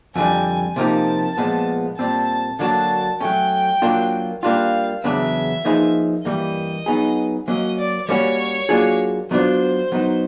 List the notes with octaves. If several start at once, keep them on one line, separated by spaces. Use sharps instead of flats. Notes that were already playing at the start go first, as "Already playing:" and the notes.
F2 D3 G3 G#5
C3 F3 A#3 D#4 G4 A5
A#2 F3 G#3 B3
A#2 G3 C4 A5
D3 F#3 A#3 D4 F#4 A5
F#3 A3 C#4 G5
F#3 A#3 D4 F4
G3 A#3 D4 F4 F5
E2 C#3 F#3 B3 D4 E5
F3 A#3 D#4 G#4 B4
G2 E3 G3 A#3 D#5
F#3 B3 D#4 G#4
F#3 A#3 C#4 D#5
D5
G3 A#3 C#4 F#4 C#5
F#3 A#3 D4 F4 G#4
F#3 B3 D4 F4 C5
F#3 B3 D#4